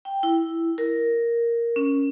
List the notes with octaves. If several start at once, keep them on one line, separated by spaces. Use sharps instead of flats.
G5
E4
A#4
C#4